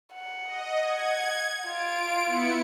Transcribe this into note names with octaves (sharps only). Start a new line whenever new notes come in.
F#5
D#5
F#5 G#6
F4 D7
B3 E4 C#7